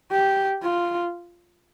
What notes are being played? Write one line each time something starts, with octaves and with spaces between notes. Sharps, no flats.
G4
F4